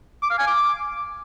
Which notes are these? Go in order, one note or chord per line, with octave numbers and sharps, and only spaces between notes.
D6
F5
G#5
D6